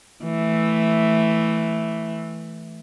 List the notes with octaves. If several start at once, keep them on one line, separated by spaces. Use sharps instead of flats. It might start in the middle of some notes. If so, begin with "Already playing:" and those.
E3 A3